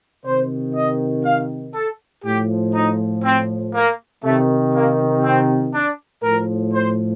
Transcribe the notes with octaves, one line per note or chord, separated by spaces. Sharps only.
C3 D#3 C5
D#5
F5
A4
A2 F3 G4
D#4
C4
A#3
C3 D#3 A3
A#3
C4
D4
A2 F3 A#4
C5